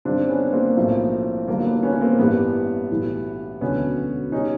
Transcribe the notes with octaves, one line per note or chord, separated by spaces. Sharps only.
G1 G2 D#3 C4 D4
B3 C#4
A#3 C4
B1 A2 F3
G1 G2 D#3 F#3 A#3
B3
B3 C#4
C#4
A#3 C4
A1 G2 E3 G3 B3
B1 A2 E3 G3
E1 D2 D3 F#3 B3 C#4
B2 G3 C#4 D#4